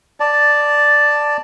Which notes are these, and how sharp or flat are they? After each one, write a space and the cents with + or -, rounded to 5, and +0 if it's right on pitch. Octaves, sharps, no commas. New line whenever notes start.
D5 +0 A5 +0